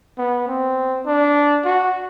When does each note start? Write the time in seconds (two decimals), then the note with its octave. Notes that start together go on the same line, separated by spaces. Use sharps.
0.18 B3
0.48 C4
1.06 D4
1.65 F#4